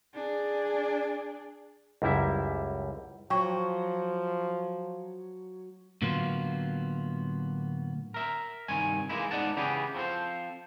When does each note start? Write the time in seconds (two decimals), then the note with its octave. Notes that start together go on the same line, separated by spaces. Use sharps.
0.14 D4 G#4
2.02 C#2 F#2 G3 E4 E5
3.30 F3 F#3 G5 C#6
6.02 A2 D3 F#3 A#3 B3 F4
8.14 A#4 E5
8.68 C2 G2 D#3 G#5
9.09 E3 G#3 A#3 D#4 E4
9.31 G#2 B3 D#4 D5 F#5 A5
9.56 C#3 E3 B3 G4 G#4
9.95 F3 C4 F4 A4 C5